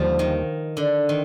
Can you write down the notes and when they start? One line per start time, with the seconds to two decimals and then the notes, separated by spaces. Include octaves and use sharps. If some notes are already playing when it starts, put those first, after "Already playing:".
Already playing: D#2 D3 F3 G3 D4 F4
0.19 D#3
0.77 D3
1.09 D#3